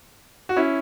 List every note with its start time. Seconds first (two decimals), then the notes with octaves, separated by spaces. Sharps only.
0.49 F#4
0.56 C#4 E4